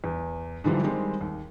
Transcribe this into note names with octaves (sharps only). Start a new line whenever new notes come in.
E2
G#2 D3 E3 F3 G3
D#3 G3 G#3 C4
D#2